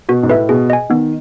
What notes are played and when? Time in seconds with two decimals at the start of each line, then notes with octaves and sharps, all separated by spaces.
0.09 B2 F#4
0.23 G#2
0.29 A2 B4 E5
0.49 B2 G#4
0.70 D#5 G#5
0.90 D#3 B3